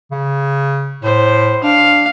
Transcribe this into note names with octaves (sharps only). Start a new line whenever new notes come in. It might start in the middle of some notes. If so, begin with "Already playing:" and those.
C#3
A2 C5
D4 F5